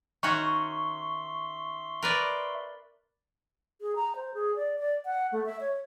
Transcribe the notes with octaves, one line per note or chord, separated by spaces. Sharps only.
D#3 C#4 F#4 E5 C6 C#6
A#4 B4 D5
G#4
A#5
C5
G#4
D5
D5
F#5
A3
E5
C#5